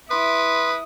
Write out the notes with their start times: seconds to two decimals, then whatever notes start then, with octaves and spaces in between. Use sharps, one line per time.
0.10 E4 B4 C6 D#6